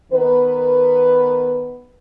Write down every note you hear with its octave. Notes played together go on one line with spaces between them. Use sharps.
D#3 B3 A#4 B4